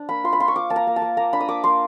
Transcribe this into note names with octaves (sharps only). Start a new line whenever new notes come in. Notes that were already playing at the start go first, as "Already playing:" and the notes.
Already playing: D4
A#3 B5
F4 C6
B5
F4 C6
C#6
F4 D6
A#3 A5
A#5
A#3
A5
A#3
A#3 A#5
D4 B5
D#6
A#3 D6
A#3 C6